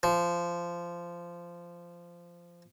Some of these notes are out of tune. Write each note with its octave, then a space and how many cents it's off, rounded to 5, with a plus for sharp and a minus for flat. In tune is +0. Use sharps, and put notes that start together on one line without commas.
F3 -15